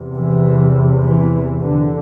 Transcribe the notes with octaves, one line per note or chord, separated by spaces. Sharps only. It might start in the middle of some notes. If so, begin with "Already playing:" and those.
Already playing: E2 C3
E3
E3
D3